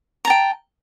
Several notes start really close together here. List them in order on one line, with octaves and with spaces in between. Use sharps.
A#5 A5 G5